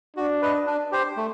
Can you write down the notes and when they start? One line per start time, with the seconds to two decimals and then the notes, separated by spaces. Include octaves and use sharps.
0.16 D4 F#4
0.42 B4 D#5
0.67 D4
0.92 G4 C5
1.17 A3